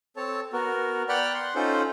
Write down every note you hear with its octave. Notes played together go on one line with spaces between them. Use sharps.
C4 A4 C#5 A5
B3 F#4 A#4
D5 F#5 G5 B5 F6 F#6
F#5 C6
C#4 D#4 F4 A4 C5